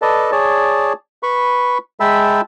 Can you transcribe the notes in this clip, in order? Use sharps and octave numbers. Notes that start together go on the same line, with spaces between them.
A4 B4 D5 D#5 A5
G#4 C#5 D5 A5
B4 B5 C#6
G#3 E5 G5 A5 B5 E6